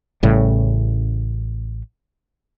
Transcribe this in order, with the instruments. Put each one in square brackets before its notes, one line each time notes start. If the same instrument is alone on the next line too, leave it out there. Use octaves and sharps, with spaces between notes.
[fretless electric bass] A1 A2 C#3 G3